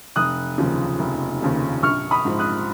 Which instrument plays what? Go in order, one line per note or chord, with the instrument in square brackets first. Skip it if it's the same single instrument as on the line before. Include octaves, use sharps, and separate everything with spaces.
[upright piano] F1 D#6 F#6
D#2 C#3 F3
F1
D#2 C#3 F3
A#1 C#6 F6
B5 D#6
G#2 F3
D#6 F#6